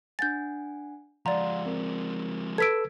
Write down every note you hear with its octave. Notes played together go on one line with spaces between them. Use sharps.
D4 F#5 G#5 G6 A6
F3 G#3 D5 F5 F#5 A#5 C6
C4 A#4
A4 B4 E6 G#6 B6 D7